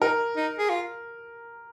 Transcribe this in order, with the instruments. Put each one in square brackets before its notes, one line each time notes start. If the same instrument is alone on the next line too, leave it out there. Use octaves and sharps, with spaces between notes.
[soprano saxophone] D#4 [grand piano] A#4
[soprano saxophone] D#4
G#4
F4